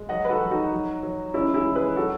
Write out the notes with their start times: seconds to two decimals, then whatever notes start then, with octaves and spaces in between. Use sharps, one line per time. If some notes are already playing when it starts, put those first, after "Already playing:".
Already playing: G#3
0.09 F#3 D#5 F#5
0.25 B4
0.29 F#4 A4
0.40 F#3
0.51 D#4 F#4
0.71 F#3
1.03 F#3
1.34 G#3 C#4 E4
1.54 E4 G#4
1.65 G#3
1.75 G#4 B4
1.96 F#3 F#4 A4